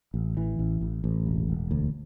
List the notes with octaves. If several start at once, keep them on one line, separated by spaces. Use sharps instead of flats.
A1
E3
A1
A1
A1
E1
E1
D2